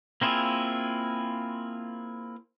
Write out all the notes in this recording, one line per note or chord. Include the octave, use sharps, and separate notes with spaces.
A#3 C4 E4 F4 G#4